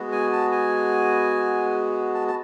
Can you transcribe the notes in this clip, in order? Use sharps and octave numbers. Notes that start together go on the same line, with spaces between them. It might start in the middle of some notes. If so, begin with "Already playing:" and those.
Already playing: G#3 B3 F#4
G#5
A5
G#5
A5
A5